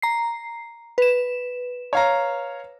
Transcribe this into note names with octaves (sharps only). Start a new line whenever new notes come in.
A#5 C7
B4 E7
C#5 F5 A#5